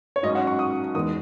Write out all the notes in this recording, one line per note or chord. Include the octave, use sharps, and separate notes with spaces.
C#5
G#2 F#3 C#4 D#5
F#5
C#6
D#6
E2 D#3 G#3 B3 D#6